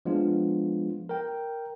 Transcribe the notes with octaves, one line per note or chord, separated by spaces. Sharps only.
F3 G#3 B3 D4 F4
A#4 G5